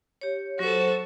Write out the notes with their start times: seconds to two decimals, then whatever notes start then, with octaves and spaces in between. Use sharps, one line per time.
0.21 G4 C#5
0.59 F#3 F#4 A4 C5